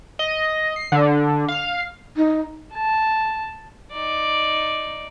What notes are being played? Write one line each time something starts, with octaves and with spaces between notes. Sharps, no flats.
D#5
C7
D3
F5
D#4
A5
D#4 D5